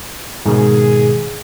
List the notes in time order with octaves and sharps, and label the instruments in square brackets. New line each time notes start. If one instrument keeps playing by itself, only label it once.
[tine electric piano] G#2 B2 D#3 [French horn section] G#4